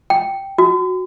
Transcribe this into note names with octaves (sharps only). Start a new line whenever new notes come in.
G5
F#4